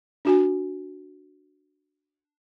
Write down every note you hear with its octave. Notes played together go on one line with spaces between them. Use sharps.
D4 F#4 G#5